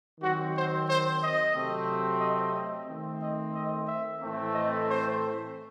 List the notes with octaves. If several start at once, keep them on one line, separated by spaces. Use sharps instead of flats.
D#3 F#3 C4 F#4
C5
C5
D#5
C3 F#3 A3 C4
D#5
D#5
D#3 A3 C4
D#5
D#5
E5
A2 E3 A3 C4
D#5
C5